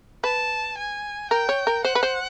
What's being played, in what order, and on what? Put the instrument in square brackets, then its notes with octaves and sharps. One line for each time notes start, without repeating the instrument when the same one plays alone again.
[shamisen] B4 [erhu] A5
[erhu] G#5
[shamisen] A#4 [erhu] G5
[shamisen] C#5
A#4
[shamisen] C5 [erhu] F#5
[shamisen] B4
C5